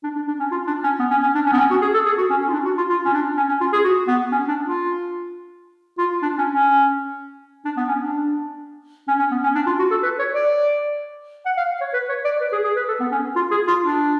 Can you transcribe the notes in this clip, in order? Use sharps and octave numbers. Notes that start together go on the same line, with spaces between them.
D4
D4
D4
C#4
F4
D4
C#4
B3
C#4
C#4
D4
C#4
B3
C#4
F#4
G#4
A4
G#4
F#4
C#4
C#4
F4
D4
F#4
F4
F4
C#4
D4
C#4
C#4
F4
G#4
F#4
B3
C#4
D4
F4
F4
D4
C#4
C#4
D4
B3
C#4
D4
C#4
C#4
B3
C#4
D4
F4
F#4
A4
B4
C#5
D5
F#5
F5
C#5
B4
C#5
D5
B4
G#4
G#4
B4
A4
B3
C#4
F4
G#4
F4
D4